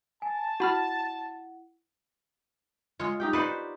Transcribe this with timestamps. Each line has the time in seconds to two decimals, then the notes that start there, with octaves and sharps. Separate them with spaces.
0.22 G#5 A5
0.60 E4 F#4 F#5 B5 F6
3.00 G#3 F4 C#5
3.20 D#4 G4 G5
3.33 D#4 F#4 B4 C5 D5